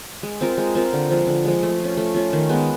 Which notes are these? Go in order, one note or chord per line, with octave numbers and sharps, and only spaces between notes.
G#3
C4 F4 A#4
G#3
C4 F4 A#4
D3
F3 G#3
D3
F3 G#3
A3
C#4 F4
A3
C#4 F4
D#3
G#3 B3